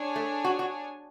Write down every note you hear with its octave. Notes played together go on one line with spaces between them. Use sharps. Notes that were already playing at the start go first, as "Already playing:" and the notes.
Already playing: D4 G#4 C#5 G#5
A3
F#4
F#4